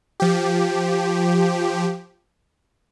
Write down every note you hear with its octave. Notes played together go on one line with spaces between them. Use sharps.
F3 G4